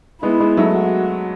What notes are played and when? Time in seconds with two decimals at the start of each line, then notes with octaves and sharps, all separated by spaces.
0.22 G#3 B3 E4
0.40 G#3 B3
0.57 F#3 A3
0.75 F#4